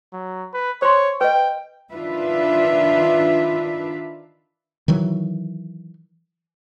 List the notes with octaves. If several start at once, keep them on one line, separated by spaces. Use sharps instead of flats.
F#3
B4
C5 C#5 C6
B4 D#5 G5
D#3 D4 F4 B4 E5
D#3 E3 F#3